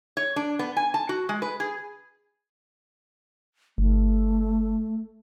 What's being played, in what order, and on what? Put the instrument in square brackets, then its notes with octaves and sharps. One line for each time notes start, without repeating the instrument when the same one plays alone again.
[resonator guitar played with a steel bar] C#5
D4
B3
G#5
A5
F#4
G#3
B4
G#4
[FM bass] G1 [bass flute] A3